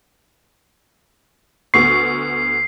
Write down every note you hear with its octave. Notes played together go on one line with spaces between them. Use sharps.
D2 B3 C#6 C7